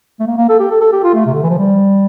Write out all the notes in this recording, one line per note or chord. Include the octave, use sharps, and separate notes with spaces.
A3
A#3
A#3
A4
G4
A4
A4
G4
F4
A3
C3
D3
E3
F3
G3